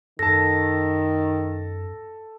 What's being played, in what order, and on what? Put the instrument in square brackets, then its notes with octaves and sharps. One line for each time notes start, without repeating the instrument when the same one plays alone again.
[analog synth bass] F#2 [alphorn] D#3 [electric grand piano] A4 A5 [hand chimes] A#6